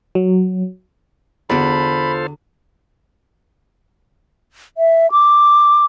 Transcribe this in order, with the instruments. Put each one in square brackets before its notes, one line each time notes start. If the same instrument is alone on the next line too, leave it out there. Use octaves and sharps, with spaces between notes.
[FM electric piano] F#3
[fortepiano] E2 [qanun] D3 F#4 [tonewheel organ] F4 A4 C5 [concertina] B5
[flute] E5
D6